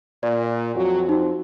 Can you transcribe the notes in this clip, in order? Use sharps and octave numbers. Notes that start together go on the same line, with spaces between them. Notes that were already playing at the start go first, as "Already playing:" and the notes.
A#2 D5
F2 F#3
C4 D#4 F#4